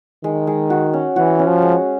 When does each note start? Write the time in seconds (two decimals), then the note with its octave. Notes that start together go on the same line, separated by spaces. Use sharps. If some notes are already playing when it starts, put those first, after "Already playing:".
0.24 D#3 G#3
0.47 G#3
0.70 F#4
0.93 C#4
1.16 E3 F#4
1.39 C#4
1.48 F3
1.62 G#3